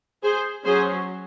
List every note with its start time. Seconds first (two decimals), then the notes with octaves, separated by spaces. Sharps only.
0.23 G#4 C5
0.65 F#3 C#4 G#4 C5